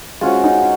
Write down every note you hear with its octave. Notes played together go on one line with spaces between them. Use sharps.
G#3 C#4 F4 F#4 C5
D#4